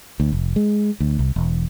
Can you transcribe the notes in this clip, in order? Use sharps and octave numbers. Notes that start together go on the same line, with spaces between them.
D2
F1
G#3
D2
C2
E1